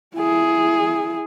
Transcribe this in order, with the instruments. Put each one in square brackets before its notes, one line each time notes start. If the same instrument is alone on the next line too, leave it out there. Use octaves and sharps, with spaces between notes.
[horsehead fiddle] E4 G#4